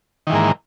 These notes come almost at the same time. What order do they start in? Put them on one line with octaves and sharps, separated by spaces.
D#3 E3 G#2 A#3